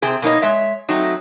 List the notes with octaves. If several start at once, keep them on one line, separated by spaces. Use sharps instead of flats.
C3 C4 G#4
B2 A#3 D#4 C#5 D#5
G#3 C#5 E5
F#3 A3 C4 D#4